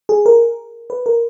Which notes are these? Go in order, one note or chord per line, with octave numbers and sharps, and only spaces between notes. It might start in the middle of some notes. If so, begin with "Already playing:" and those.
G#4
A#4
B4
A#4